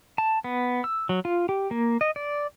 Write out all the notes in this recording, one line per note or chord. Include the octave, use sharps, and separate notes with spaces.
A5
B3
E6
F#3
F4
G4
A#3
D#5
D5